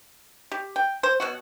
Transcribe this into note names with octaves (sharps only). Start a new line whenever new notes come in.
G4
G5
C5
B2 F#3 F#4